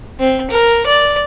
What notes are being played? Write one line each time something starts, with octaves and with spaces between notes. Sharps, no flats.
C4
A#4
D5